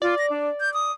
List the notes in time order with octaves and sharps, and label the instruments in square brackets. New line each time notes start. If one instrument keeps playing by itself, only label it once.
[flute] F4 [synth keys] D5
[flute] A#6
D4
G6
D#6